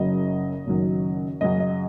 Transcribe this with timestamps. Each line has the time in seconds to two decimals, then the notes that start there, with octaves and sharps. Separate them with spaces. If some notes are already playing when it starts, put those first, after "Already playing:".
Already playing: F#1 F#2 C#3 F#3 D#5
0.66 F#1 F#2 D#3 F#3
1.41 F#2 C#3 F#3 D#5
1.60 D#5